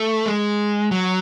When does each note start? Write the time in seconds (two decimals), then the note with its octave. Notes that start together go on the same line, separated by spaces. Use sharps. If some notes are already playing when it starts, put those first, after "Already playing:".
Already playing: A3
0.26 G#3
0.91 F#3